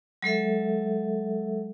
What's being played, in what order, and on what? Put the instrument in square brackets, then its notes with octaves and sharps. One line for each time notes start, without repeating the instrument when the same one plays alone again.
[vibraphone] F#3 G#3 A4 E5